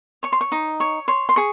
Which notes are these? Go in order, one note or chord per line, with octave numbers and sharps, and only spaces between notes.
C#5 C#6
C6
C#6
D#4
C#5 C#6
C#5 C6
C6
G#4 C#6